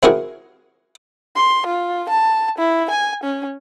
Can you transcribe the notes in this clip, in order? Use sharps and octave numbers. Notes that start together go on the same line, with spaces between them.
C4 E4 F#4 G#4 A#4 F#5
C6
F4
A5
E4
G#5
C#4